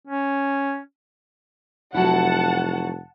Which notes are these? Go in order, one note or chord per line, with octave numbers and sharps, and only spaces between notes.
C#4
F1 F#3 E4 F#5 A5